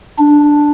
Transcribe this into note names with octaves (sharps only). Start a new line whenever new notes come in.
D4